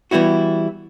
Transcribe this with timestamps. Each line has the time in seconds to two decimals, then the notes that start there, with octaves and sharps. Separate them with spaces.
0.11 E3 G3 B3 E4 F#4